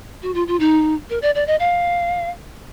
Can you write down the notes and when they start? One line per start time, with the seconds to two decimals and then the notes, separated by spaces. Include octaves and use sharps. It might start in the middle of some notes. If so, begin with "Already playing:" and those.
0.22 F#4
0.34 F4
0.47 F4
0.60 D#4
1.10 A#4
1.22 D5
1.35 D5
1.47 D#5
1.60 F5